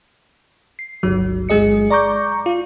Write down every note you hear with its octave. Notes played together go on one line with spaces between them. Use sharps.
C7
G1 C#2 F#3
G1 G#3 G#4 D#5 C#7
D5 A#5 C#6 D6 G6
F4